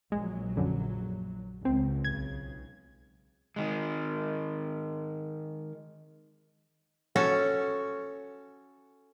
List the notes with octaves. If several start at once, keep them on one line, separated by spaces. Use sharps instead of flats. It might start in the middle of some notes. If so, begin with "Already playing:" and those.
A#1 F#3 G#3
F#2 D3
C#2 C4
B1 C#3 G#6
D#3 G#3
C#4 F#4 A4